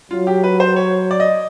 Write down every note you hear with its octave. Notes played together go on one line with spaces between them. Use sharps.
F#3 F4
G4
B4
C5
C#5
D5
D#5